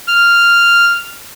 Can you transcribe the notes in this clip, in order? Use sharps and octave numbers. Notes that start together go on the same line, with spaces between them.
F6